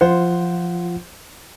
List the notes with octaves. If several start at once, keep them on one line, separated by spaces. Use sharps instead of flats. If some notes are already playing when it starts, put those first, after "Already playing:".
F3 F4 C5 F#5